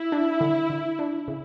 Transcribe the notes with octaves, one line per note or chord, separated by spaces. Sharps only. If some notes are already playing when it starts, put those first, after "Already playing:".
Already playing: E4
D4
D3
D3
D4
C#3